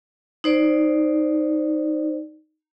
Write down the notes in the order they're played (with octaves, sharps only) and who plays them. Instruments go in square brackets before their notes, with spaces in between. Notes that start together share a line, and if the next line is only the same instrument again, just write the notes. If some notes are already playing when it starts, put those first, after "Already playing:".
[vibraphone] D#4 C5 D5